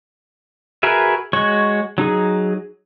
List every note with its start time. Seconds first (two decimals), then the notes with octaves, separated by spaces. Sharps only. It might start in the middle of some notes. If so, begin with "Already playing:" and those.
0.83 F#4 G#4 A#4 B4 E5
1.33 G#3 F#4 C#5 C#6
1.98 F#3 D#4 G#4